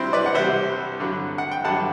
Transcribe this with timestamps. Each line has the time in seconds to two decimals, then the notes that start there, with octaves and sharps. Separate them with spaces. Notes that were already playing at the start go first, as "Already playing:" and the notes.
Already playing: C2 C3 G3 C4 D4 E4
0.13 B4 D5
0.26 F#5
0.35 C2 C3 G3 C5 E5
1.00 G2 D3 F#3
1.38 F#5
1.51 G5
1.64 G2 D3 F#3 F#5 A5